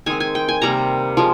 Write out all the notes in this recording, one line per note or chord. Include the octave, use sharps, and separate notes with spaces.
D#3 G#3 C4 G#5
G#5
G5
G#5
C3 G3 A#3 A#5
F3 G#3